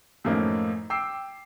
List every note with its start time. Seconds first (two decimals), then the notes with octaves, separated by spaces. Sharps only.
0.24 F#2 A2 F3 A#3 C#4 D#4
0.90 G5 D6 E6 C7